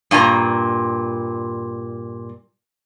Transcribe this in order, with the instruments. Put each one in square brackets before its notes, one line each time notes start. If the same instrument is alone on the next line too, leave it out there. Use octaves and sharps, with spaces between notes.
[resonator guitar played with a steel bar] G2 A#2 G#5 A#5